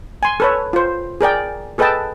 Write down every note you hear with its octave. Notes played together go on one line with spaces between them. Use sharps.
G#5 C6
A4 B4 C#5
F4 C5
G#4 A#4 D5 G5
G#4 A4 B4 D#5 G5 A5